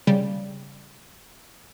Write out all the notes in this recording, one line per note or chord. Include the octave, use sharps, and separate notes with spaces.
C#3 G3